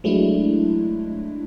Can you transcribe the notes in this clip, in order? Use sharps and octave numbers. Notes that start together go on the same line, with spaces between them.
F#3 G#3 A3 D4 E4